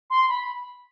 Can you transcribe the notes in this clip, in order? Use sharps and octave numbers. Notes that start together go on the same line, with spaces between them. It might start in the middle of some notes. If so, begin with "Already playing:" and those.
C6
B5